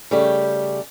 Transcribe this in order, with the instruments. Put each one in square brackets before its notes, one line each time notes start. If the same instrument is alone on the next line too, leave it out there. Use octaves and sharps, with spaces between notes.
[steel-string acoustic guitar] C#3 G3 A3 G4